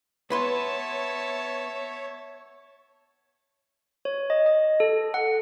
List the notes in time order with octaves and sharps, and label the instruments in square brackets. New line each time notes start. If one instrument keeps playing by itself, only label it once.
[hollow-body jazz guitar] B3 B4 C6 [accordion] C#5 [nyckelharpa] E5 A5
[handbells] C#5
D#5
D#5
A4
F#5